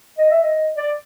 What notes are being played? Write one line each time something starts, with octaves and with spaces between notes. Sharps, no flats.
D#5
E5
D#5
D5